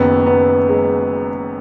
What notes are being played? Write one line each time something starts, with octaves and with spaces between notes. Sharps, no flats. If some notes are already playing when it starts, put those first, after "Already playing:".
Already playing: F#1 F#2 D#3 B3
B3
G#3